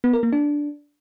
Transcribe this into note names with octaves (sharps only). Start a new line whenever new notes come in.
B3
A#4
A#3
D4